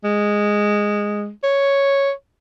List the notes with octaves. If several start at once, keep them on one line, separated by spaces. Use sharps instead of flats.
G#3
C#5